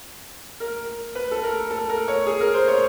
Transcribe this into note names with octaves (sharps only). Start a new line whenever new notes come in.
A#4
B4
A4
A#4
A4
A#4
C#5
G#4
A#4
C5
C#5